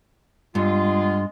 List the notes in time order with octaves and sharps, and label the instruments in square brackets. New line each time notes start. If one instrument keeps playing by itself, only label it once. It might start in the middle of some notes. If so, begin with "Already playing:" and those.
[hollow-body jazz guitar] G2 [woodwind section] G#3 B3 F4